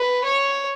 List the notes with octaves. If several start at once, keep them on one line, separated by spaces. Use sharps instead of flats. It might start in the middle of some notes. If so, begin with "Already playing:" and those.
Already playing: B4
C#5